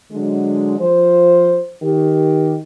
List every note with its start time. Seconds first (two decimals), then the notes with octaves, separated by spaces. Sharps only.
0.12 D3 F#3 G#3
0.79 F3 C5
1.82 D#3 G4